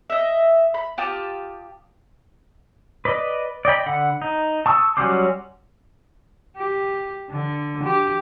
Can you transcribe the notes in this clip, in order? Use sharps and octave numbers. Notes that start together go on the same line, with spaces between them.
D#5 E5
B5
F4 G4 A5 D#6
B4 D5 D#5
D5 D#5 G5 B5
D3 F#5 B5
D#4
A5 C#6 D#6 E6
F#3 G3 C#4 C5 D6
G4
D3
G4